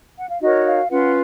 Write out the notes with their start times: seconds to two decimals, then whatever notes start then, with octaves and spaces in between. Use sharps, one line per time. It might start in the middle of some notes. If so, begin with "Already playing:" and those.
0.19 F#5
0.30 F5
0.40 D#4 F#4 A#4 C#5 D#5
0.66 F5
0.90 C#4 F4 B4 F#5